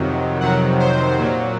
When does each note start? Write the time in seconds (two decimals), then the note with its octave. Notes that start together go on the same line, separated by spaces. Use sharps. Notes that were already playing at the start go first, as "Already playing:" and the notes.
Already playing: F2 C3 D#3 F#3
0.41 F2 C3 D#3 F#3 F#5
0.80 C5
1.19 A#2 F#3